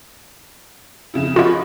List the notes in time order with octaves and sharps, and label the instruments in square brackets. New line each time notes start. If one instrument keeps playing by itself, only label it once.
[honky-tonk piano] F2 C#3 E4
[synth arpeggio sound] F4 F#4 [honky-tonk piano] C#5 D#5 B5